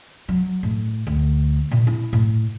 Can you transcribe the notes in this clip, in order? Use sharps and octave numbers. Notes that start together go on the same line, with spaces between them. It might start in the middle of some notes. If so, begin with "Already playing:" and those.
F#3
A2
D2
A#2
E4
A2